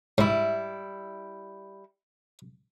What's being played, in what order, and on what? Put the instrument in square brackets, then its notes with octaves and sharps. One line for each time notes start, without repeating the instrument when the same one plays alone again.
[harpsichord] G#2 [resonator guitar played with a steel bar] G3 E4